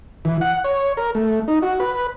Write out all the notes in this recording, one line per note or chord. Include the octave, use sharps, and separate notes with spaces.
E3
F#5
C#5
A#4
A3
D#4
F#4
B4